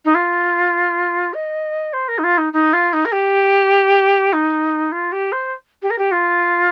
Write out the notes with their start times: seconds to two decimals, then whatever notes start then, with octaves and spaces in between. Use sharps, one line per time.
0.05 D#4
0.14 F4
1.34 D#5
1.93 C5
2.08 A#4
2.18 D#4
2.24 F4
2.38 D#4
2.53 D#4
2.73 F4
2.93 D#4
3.05 A#4
3.13 G4
4.33 D#4
4.92 F4
5.12 G4
5.32 C5
5.82 G4
5.90 A#4
5.98 G4
6.12 F4